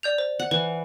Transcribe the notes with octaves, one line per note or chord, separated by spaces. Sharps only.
D5 G6 F7
C5
F#5
E3 B4